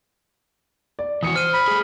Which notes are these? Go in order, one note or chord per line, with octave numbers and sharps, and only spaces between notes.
D5
E3 F#4 D#6 C#7
C5 F6 D#7
B5
A3 G#4